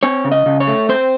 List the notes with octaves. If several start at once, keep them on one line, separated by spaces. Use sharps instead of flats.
C4 C#5
C#3
D#5
C#3
C#5
A3
C4 C5